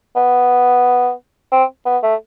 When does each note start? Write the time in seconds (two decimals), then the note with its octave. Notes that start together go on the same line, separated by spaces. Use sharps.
0.16 B3
1.52 C4
1.86 B3
2.03 A3